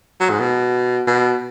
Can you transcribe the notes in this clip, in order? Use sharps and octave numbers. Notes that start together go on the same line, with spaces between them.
F#3
G#2
B2
B2